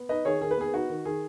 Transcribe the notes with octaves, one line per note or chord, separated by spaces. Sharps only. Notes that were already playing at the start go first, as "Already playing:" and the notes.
Already playing: B3
D#4 B4 D#5
D#3 G#4 C#5
D#3 G#4
B4
B3 G#4
D#4 F#4
D#3
D#3 G#4